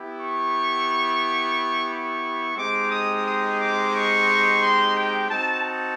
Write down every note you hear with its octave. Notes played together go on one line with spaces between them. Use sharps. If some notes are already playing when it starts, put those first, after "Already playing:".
Already playing: B3 E4 G4
C#6
C#6
G#3 C4 D#4 G4 D6
D#6
D#6
D6
C#6
C6
G5
C4 D#4 F#4 A5
A5